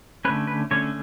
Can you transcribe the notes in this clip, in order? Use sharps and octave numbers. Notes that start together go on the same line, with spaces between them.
D3 A3 C#4 B4
B4
D3 A3 C#4 C#5